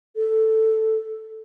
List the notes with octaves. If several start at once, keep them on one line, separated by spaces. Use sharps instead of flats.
A4